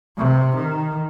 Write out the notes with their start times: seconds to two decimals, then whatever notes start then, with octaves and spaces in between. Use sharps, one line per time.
0.17 C3
0.56 D#3